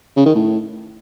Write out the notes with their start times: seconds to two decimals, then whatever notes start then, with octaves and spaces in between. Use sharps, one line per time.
0.17 C#3
0.26 D#3
0.35 A2